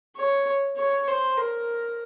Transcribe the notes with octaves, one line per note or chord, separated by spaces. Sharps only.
C#5
C#5
C5
A#4